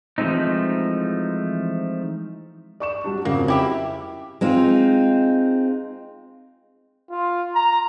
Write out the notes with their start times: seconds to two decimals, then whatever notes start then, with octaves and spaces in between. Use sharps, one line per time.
0.18 E3 F3 G#3 A3 C4 D#4
2.80 D5 C#6 E7
3.04 F#3 G3 D4
3.25 F2 C#3 F#3 A#3
3.48 E4 G4 E5
4.41 G#3 C4 D#4 F4
7.10 F4
7.55 A#5